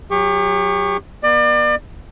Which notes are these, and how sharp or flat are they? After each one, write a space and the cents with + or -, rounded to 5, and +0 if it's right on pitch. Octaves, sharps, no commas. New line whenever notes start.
F#3 +0 G4 +40 C#6 +0
B3 -40 D5 +35